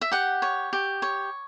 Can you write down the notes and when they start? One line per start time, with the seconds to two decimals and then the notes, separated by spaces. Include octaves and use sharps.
0.01 E5
0.11 G4 F#5
0.42 C#5
0.73 G4
1.02 C#5